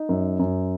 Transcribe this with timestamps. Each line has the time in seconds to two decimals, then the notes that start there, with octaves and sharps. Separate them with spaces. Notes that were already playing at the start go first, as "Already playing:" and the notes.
Already playing: D#4
0.09 F#2
0.39 F#2